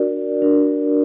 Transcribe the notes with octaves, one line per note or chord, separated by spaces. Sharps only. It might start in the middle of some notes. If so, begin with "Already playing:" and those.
Already playing: D4 F#4 A#4 D5
D4 F#4 A#4 D5